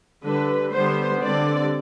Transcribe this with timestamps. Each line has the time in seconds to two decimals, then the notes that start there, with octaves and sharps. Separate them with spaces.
0.23 D3 G3 D4 B4
0.72 D3 G3 B3 C5
1.22 D3 G3 C4 D5